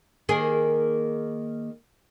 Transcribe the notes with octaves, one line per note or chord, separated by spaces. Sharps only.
D#3 A#3 G#4